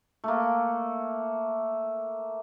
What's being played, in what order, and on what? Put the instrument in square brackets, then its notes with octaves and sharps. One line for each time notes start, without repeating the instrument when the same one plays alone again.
[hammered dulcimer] A3 A#3